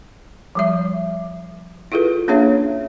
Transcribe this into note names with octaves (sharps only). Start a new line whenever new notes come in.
F3 G3 E5
E4 F4 G#4 A4 B4
A#3 C#4 D4 G#4 C#5 E5